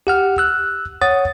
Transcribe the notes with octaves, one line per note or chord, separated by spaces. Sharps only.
G4 F#5 F6
E6 F#6
C#5 F#5 D#6 A6